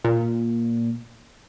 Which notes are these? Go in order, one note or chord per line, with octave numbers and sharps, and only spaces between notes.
A#2